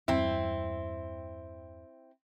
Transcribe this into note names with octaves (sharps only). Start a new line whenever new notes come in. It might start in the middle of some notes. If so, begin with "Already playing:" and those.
E2 G2 G3 C4 E4